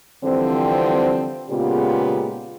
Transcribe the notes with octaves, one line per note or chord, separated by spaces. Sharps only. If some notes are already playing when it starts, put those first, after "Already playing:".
D3 E3 F3 G3 C4
A#2 C#3 G#3 B3 F4 G4